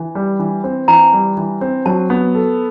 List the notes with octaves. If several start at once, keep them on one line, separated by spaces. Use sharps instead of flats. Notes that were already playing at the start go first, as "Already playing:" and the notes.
Already playing: E3
G3
E3
C4
E3 A#5
G3
E3
C4
F#3 A5
B3
A4